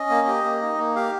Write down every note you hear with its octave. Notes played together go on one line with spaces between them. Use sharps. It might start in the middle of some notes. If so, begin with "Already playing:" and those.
Already playing: C#4 D#5
A#3
G4
A#3
D#4
A#3
G4 F5